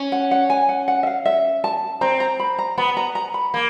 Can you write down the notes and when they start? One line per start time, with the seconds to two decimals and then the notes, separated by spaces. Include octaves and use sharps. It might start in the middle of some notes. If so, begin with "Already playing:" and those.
Already playing: C#4
0.12 F#5
0.31 F#5
0.50 G#5
0.69 F#5
0.88 F#5
1.03 E5
1.07 F5
1.25 E5
1.64 A5
2.01 C4 A#5
2.20 A#5
2.39 B5
2.59 A#5
2.78 B3 B5
2.97 A#5
3.15 A#5
3.34 B5
3.54 A#3